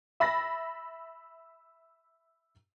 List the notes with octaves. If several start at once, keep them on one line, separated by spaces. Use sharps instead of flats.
E5 B5 A6 A#6